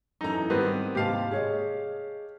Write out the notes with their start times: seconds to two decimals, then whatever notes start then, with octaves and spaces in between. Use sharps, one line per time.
0.21 F#2 E3 D#4 A4 A#5
0.50 G#2 D#3 G3 B3 C4 B4
0.95 D#2 G#2 C3 G4 F5 A5
1.31 G#4 C#5 D#5